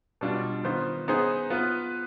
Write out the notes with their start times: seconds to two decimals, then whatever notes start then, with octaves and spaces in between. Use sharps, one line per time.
0.21 B2 G3 D4 F4
0.64 D#3 B3 F4 C5
1.08 B3 D#4 G#4 C5
1.50 B3 F4 B4